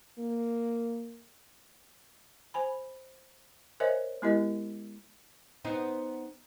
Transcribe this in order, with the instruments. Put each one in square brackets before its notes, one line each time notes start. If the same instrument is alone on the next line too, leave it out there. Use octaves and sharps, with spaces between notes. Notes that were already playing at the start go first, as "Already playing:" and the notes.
[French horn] A#3
[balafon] C5 G#5 B5
A#4 C5 C#5 D#5 E5 G#5
G#3 B3 E4 G4 A#4 D#5
[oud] B3 C4 D#4